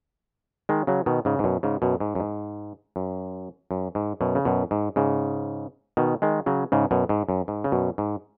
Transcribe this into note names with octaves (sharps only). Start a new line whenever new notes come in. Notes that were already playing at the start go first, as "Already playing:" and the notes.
D#3 G#3
C#3 F#3
B2 D#3
G#2 C#3
G#2
F#2 B2
G#2 C#3
F#2 B2
G#2
F#2
G#2
F#2
F#2
G#2
F#2 B2
C#3
F#2 B2
G#2
G#2 C#3
B2 D#3
D#3 G#3
C#3 F#3
G#2 C#3
F#2 B2
G#2
F#2
G#2
C#3
F#2 B2
G#2